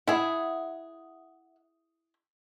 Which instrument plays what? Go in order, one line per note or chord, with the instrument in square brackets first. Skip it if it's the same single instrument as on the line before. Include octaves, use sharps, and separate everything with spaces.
[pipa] E4 G#4 [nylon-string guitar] E5 F#5